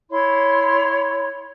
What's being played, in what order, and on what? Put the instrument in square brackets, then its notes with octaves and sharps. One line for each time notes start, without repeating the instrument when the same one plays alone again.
[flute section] E4 C#5 C6